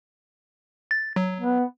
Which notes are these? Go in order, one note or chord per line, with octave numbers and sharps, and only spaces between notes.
A6
F#3
B3